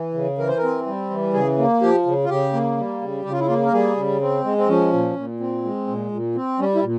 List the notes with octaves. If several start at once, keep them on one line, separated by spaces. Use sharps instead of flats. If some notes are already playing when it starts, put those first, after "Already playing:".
Already playing: E3
C#3
E3 A#4
C5
A#4
C4
G3
E3
C#3 G#4
A#3
F3 G4
C#3
F4
C#3 G4
A#3
G3
C#3
C#3 G4
F4
E4
A#3 F4
A#4
G3 G#4
C#3
C4
G#3
C4
F3 C#4
A#2
A#2
C4
G#3
A#2
A#2
C4
G3 C#4
E4
A#2